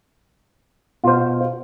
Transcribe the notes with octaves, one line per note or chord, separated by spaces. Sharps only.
B2 F4 C5